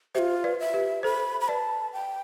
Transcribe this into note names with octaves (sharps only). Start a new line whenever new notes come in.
F4 G4 C5 E5
B4 D5
E5
G4 B4
A4 C5 B5
B5
B4 D5 A5
G5